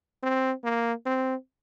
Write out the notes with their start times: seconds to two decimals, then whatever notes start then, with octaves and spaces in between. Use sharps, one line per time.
0.23 C4
0.64 A#3
1.06 C4